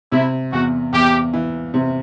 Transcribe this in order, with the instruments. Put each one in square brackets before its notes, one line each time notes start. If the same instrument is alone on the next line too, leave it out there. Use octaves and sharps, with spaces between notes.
[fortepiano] C3 [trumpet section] E4
[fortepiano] E2 [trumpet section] F#4
[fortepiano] E2 [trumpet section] G4
[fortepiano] E3
C3